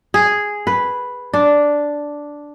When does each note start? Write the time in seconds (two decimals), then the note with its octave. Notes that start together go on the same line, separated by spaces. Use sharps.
0.14 G#4
0.67 B4
1.33 D4